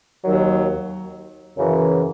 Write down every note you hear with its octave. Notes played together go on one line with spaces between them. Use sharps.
D#2 D#3 F#3
F#2 C#3 E3